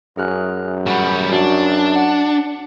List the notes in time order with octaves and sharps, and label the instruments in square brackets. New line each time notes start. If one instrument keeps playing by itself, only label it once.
[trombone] F#2 [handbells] G#4 F6 F#6
[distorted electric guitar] G3 F#4 [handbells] G#4 F#5 B5
[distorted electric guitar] D4 [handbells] F#4
[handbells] F#5